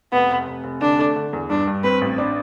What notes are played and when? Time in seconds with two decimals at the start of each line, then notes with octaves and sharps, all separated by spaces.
0.13 F1 B3
0.29 F1
0.47 F1
0.64 F1
0.81 D3 D4
0.98 A3
1.16 D3
1.33 E2
1.49 G2 D4
1.67 G2
1.84 C4 B4
2.01 A1
2.18 D4